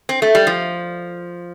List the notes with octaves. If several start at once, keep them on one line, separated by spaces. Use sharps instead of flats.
C4
A3
G3
F3